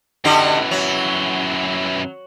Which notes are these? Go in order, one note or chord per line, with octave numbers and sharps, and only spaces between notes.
F#2 D3 E3 D#4 G4
F#3